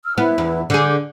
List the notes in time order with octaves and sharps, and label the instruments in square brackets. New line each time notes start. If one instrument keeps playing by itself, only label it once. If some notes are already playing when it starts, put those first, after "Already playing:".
[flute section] E6 F6
[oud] B3 [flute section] E4 B4
[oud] E2
[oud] D3 G#4 [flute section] D6 G6